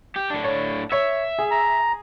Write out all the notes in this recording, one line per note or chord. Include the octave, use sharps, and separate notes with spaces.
G4
A2 D4
C#5
C#5 E5
G#4
A#5